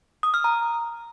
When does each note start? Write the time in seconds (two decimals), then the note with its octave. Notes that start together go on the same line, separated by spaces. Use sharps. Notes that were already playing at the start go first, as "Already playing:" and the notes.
0.23 D#6
0.34 F6
0.44 A#5